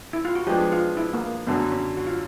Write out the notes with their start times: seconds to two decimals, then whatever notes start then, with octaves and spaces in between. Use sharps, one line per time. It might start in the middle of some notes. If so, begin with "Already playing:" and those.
0.13 E4
0.25 F4
0.35 F#4
0.47 F3 G#3 B3 D4 G4
0.72 F4
0.97 E4
1.14 A#3
1.47 F#2 D3 F#3 B3
1.72 C#4
1.97 F#4
2.07 F4